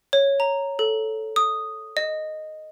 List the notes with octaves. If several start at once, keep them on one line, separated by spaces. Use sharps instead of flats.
C#5
A#5
A4
D#6
D#5